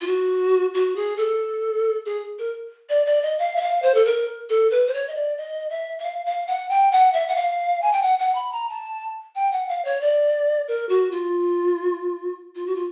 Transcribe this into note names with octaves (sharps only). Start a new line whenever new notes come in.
F4
F#4
F#4
G#4
A4
G#4
A#4
D5
D5
D#5
F5
E5
F5
C5
A4
A#4
A4
B4
C5
C#5
D#5
D5
D#5
E5
E5
F5
F5
F#5
G5
F#5
E5
F#5
F5
G#5
G5
F#5
F#5
B5
A#5
A5
G5
F#5
F5
C#5
D5
A#4
F#4
F4
F4
F#4
F4